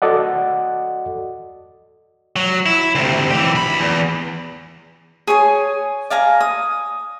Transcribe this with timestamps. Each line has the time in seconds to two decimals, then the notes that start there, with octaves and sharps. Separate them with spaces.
0.02 F#4 A4 D5 D#5 F#5
2.36 F#3
2.66 E4
2.95 D2 C3
3.30 E3 G4
3.55 D2 B5
3.80 E2
5.27 G#4 C#5 G#5
6.10 D5 F5 G#5 A#5
6.40 D#6